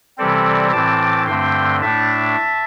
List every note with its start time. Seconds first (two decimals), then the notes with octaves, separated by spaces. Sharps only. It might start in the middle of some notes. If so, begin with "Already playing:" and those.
0.18 C3 E3 G3 C4 A4 D5
0.73 A2 E3 C4 A5 D6
1.27 G2 D3 A3 C4 G5 C6
1.81 A2 A3 D4 E5 A5